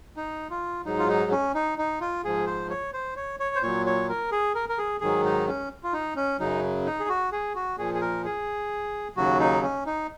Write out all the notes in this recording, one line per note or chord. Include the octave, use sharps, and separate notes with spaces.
D#4
F4
G#2 F#3 D#4
F4
D#4
C#4
D#4
D#4
F4
G#2 F3 G#4
C5
C#5
C5
C#5
C#5
C5
A#2 F#3 C#5
C#5
A#4
G#4
A#4
A#4
G#4
G#2 D#3 F#3 G#4
D#4
C#4
F4
D#4
C#4
F#2 C#3 F#3 D#4
D#4
G#4
F#4
G#4
F#4
A#2 F3 G#4
G#4
A#4
G#4
D#2 C#3 F#3 F#4
D#4
C#4
D#4